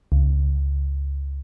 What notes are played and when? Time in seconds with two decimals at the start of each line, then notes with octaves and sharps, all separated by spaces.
0.12 C#2